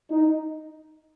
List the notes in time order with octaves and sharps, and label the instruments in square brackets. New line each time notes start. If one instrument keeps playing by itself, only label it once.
[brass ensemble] D#4